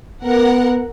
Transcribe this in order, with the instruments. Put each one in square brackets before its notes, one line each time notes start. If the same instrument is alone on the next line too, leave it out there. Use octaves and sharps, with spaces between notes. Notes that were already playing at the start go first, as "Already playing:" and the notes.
[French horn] B3 [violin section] A#4 F#5